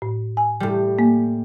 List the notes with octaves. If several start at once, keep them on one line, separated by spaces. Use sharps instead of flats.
A2
G#5
A2 G3
A#3